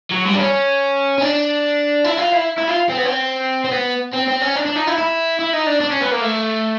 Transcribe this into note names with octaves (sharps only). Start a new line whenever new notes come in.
F#3
G3
D4
C#4
C#4
D4
E4
F4
E4
E4
F4
C4
B3
C4
C4
B3
C4
C4
C#4
D4
D4
D#4
E4
E4
E4
D#4
D4
D4
C#4
B3
A#3
A3